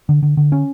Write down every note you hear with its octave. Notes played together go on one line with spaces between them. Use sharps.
D3
D3
D3
C#4